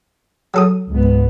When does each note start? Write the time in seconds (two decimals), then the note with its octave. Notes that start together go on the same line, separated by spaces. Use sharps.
0.54 F#3 A4 D#6
0.90 C#2 G#2 B3